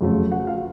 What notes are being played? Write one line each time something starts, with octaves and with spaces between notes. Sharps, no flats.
F2 C#3 F#3 A3
F#4 F#5
F4 F5